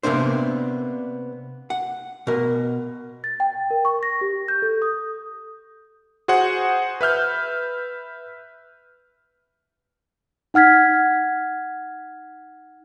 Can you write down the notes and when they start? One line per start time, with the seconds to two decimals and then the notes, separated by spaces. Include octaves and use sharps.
0.03 C3 A#3 B3 D4 C5
1.70 F#5
2.27 B2 A#4
3.24 A6
3.40 G5
3.71 A#4
3.85 C#6
4.03 A#6
4.21 G4
4.48 G6
4.62 A4
4.82 D#6
6.28 F#4 G#4 C5 F#5
7.01 B4 E5 F6 G6
10.54 D#4 F#5 F6 G#6 B6